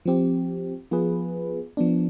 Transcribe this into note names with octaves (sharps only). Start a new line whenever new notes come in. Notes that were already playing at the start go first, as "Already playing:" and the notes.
F3 C4 G4
F3 B3 F4 G#4 B4
F3 B3 D4